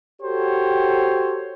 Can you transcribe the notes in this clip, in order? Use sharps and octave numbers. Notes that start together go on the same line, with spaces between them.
F#4 G4 A4 C5 C#5